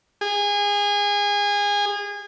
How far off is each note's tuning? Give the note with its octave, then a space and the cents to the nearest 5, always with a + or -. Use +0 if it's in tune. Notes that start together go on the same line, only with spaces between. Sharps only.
G#4 -25